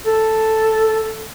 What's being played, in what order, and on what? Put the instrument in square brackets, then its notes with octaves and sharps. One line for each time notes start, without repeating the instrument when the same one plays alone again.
[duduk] A4